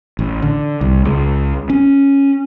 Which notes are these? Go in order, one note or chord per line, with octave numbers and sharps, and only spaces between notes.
A1
D3
C2
C#2
C#4